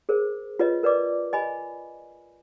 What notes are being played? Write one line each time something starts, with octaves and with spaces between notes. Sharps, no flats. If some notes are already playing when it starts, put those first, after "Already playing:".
G#4 A#4 C5
F4 B4 C#5 D#5
A#4 B4 D5 D#5 D6
D#5 G#5 B5